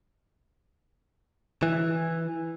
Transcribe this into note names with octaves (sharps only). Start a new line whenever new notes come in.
E3